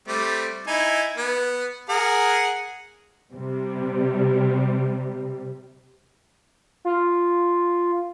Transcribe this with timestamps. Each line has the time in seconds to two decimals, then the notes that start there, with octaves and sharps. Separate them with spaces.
0.08 G3 A3 C4
0.67 D#4 E4 G#5
1.18 B3
1.89 G#4 A#4 F#5
3.32 C3 G3
6.85 F4